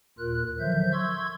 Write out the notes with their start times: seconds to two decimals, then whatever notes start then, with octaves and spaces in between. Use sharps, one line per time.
0.19 D#2 A#2 F4 A#4 F#6
0.59 D3 D#3 F3 F#3 E5 G6
0.93 C6 C#6 E6 G#6